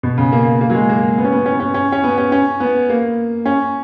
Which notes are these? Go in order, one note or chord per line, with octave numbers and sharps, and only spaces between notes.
B2
C#3
A#3
A#3
F#3
G#3
A#3
B3
C#4
B3
C#4
B3
C#4
C#4
C#4
B3
C#4
C#4
B3
A#3
C#4